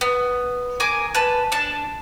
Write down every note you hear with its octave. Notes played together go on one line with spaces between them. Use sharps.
B3
G#4 A#4 G#5 D6
B4 A5
D4 A5